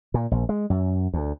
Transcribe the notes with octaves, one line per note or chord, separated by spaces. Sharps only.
A#2
A#1
G#3
F#2
D2